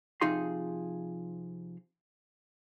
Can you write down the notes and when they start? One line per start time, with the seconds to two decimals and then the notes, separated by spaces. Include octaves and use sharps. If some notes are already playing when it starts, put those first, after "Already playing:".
0.21 C3 F3 D#4 F4 G#4 C6